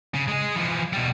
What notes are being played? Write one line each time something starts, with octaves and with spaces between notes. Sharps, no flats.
C#3
G#3 G#4
E3 F3
B2 G3